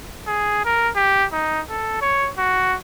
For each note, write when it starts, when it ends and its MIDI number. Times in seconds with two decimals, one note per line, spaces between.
0.27 0.65 68
0.65 0.90 70
0.96 1.25 67
1.32 1.62 63
1.70 1.99 69
2.02 2.30 73
2.38 2.77 66